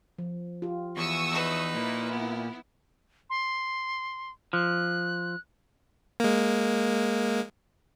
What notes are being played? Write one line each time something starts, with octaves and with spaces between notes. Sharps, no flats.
F3
F4 G4
E2 C#6 D#6 E6
D#4 B4
A#2 E4
B3
C6
F3 F#6
G#3 A#3